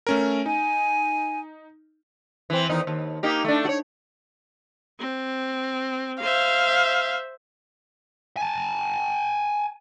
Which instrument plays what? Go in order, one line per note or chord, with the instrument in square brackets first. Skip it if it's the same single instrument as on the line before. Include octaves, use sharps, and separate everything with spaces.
[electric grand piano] A3 C#4 A#4
[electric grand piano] D#4 [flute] G#5
[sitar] E3 C4
E2 D#3 D#4
D#2
A#3 D#4 G4
A3 D4
F#4 C#5
[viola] C4
[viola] C5 E5 [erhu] F5
[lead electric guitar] G#5 A5